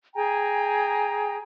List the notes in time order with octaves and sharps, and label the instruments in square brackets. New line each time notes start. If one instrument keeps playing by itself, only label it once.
[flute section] G#4 G5 G#5 A#5